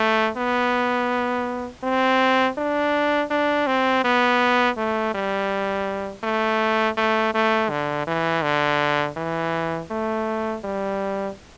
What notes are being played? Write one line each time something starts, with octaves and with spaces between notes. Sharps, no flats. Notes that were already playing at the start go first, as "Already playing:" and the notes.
Already playing: A3
B3
C4
D4
D4
C4
B3
A3
G3
A3
A3
A3
D3
E3
D3
E3
A3
G3